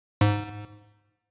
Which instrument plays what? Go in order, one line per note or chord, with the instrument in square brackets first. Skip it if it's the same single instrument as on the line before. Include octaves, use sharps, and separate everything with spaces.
[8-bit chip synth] G#2